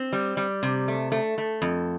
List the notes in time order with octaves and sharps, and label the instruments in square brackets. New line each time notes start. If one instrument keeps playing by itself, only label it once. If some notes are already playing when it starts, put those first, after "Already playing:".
Already playing: [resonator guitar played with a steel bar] C4
G3
G3
C3
A3
A3
A3
F2